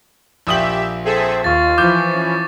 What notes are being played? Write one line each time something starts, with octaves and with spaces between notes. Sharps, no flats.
A#1 G4 E5 D#6 F#7
C4 G#4 A4 E5
D#2 F4 C#6 A6
E3 F3 D6 G6
C#4